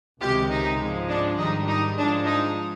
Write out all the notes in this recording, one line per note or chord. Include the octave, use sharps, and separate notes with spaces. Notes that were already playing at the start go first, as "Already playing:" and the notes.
C#2 C3 D#3 G#3 F4 G4
D#4
G#2 F3 G#3
D4
G#2 D#3 G3 D#4
D#4
G#2 F3 G#3 D4
D#4